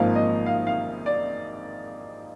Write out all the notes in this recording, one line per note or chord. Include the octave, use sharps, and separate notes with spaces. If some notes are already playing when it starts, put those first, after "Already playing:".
Already playing: G#1 G#2 F3 A#3 F5
D#5
F5
F5
D5